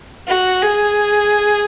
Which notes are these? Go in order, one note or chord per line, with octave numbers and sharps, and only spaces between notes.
F#4
G#4